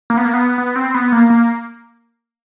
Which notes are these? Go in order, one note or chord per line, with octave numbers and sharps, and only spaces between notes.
A#3
B3
A#3
B3
B3
C4
B3
A#3
A#3